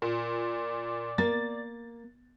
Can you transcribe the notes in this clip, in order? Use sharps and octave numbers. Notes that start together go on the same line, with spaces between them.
A#2 D5
A#3 A6